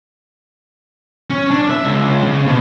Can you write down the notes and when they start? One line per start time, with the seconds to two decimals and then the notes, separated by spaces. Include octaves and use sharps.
1.30 C#4
1.51 D4
1.70 E5
1.85 C#2
2.24 C#3
2.47 B2